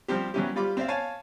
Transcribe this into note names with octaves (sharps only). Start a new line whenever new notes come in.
F3 G3 C4 G4
E3 F#3 G3 C#4 E4 G4
G3 F4 B5 D6
C4 D5 E5 F5
C#5 F5 G#5 A5